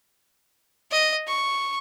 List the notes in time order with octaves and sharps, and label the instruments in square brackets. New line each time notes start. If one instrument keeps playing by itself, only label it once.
[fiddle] D#5
C#6